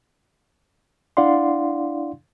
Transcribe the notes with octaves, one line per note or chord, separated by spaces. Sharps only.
D4 E4 D5 F5 F#5 C6